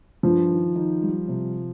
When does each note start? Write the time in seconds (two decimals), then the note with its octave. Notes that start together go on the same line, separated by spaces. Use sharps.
0.23 G2 F3
0.50 D#3
0.76 D#3
1.02 G3
1.28 C3